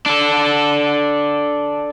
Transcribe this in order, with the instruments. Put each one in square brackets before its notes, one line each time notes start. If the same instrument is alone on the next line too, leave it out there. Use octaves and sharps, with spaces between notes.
[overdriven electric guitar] D4 A4